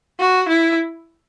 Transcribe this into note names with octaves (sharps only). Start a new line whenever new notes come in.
F#4
E4